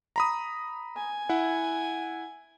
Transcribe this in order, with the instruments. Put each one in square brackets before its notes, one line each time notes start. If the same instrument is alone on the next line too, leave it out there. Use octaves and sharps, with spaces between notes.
[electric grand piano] A#5 B5 D#6
[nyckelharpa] G#5
[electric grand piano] E4 F#5